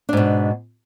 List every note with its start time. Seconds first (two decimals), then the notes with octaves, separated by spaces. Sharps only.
0.09 D4
0.13 G#2
0.17 B2